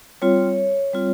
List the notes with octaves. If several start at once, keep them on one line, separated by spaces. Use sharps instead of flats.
G3 C4 F4 C#5
G3 C4 F4